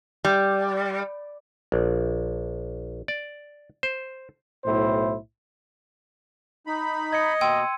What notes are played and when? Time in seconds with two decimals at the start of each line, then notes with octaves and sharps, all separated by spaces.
0.25 G3
1.72 A#1
3.08 D5
3.83 C5
4.65 B1 A2 E4 C5
6.67 D#4 B5
7.13 D#5 G#6 C#7
7.41 B2 A#3 G5 C6 E6 D#7